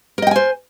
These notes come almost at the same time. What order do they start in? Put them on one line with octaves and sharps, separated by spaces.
A#4 D#5 G5 G#5 C5